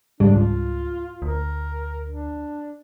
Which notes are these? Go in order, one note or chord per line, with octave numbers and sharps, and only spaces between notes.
G#2 C#3 G3 D4
C#2 F4
D2 A#4
D4